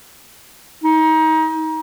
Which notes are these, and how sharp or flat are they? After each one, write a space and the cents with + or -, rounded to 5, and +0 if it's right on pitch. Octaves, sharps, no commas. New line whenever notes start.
D#4 +25